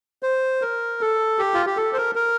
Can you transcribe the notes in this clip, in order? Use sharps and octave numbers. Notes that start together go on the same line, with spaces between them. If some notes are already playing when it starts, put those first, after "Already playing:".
C5
A#4
A4
G4
F4
G4
A4
C5
A#4
A#4